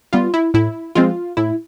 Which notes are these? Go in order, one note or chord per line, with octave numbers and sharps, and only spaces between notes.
G3 B3 F4
E4
A2 E4
F3 G#3 C4 F4
A2 E4